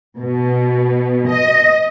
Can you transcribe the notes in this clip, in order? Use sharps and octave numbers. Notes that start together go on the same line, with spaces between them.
B2
D#5